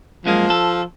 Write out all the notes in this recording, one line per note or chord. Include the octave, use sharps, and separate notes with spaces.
F#2 F3 G#3 A#3
A4